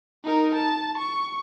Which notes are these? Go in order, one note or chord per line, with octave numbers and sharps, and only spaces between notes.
D#4 A#4
A5
C#6